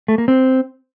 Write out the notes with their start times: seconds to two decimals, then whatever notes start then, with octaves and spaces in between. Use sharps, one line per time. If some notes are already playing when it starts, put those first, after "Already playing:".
0.08 A3
0.18 A#3
0.28 C4